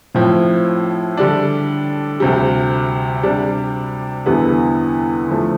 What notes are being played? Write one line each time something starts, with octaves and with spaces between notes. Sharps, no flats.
A2 F3 C4
D3 G3 D4
D2 C3 G3
C3 G3 D4
E2 D3 G3 B3 E4
D3 F3 A3